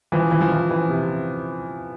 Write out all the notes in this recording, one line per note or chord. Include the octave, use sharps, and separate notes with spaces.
E3 F3
E3
F3
E3
E3
C3